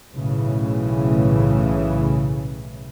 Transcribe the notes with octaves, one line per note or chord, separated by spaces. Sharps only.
B1 A2 C#3 E3